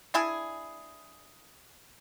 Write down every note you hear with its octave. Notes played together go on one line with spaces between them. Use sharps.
D4 E4 G#4 G#5